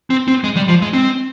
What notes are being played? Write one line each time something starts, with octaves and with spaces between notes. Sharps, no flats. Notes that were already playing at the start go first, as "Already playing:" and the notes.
C4
C4
G#3
G3
F3
G#3
C4